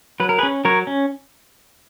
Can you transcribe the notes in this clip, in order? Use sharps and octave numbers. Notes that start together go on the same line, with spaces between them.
F#3 B4
A#4
G#4 B4
C#4
F#3 A#4 C#5
C#4